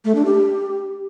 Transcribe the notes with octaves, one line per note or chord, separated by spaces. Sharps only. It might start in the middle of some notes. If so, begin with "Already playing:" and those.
A3
D4
G4